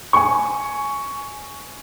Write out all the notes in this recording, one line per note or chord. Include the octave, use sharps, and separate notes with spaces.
G#5 C#6